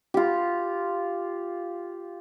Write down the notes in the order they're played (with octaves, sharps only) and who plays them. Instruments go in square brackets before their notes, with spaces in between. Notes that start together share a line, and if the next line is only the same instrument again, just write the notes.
[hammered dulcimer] F4 G4